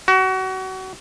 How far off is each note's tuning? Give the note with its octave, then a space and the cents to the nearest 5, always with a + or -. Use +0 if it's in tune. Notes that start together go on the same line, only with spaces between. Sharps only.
F#4 +30